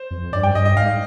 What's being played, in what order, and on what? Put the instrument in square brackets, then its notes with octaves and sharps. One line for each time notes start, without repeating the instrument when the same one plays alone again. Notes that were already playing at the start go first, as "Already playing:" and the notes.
Already playing: [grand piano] C5
[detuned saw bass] F2
[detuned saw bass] G2 [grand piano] D5
[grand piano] G5
[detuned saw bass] G2 [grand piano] D#5
[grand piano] D#5
[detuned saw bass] G#2 [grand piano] F5